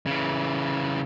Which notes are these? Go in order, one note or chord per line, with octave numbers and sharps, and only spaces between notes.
C#3 E3